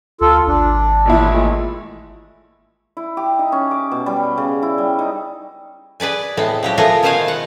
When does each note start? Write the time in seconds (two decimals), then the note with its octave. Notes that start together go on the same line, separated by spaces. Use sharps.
0.21 D2 F4 A4
0.48 G#1 D4
1.05 A1 A#2 E4
1.29 G#3 A3
2.97 E4
3.17 G4
3.39 D#4
3.52 C#4
3.71 D6
3.92 B2
4.06 G3
4.37 C#3
4.62 E4
4.78 G3
4.99 D#4
6.00 G#4 B4 D5 G#5
6.37 A2 G#3 B3 C4
6.63 F3 F#3 G4
6.78 A3 B3 F4 G#4 A#4
7.03 B2 D#3 F4 C5 F5 G#5
7.28 F#5